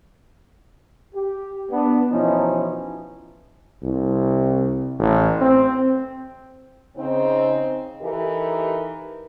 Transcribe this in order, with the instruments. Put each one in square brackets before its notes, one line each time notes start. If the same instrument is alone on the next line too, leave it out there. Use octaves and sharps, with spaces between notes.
[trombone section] G4
B3 D4
B2 E3 F3 C#4 D#4 E4
[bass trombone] C2
A1
C4
[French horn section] C#3 C4 D#4
E3 D#4 G4 A4 A#4